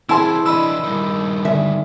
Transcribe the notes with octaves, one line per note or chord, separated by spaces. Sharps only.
E3 C4 E4 G#4 A5 C6 E6
E3 D4 D#5 B5 E6
G2 D#3
D3 E5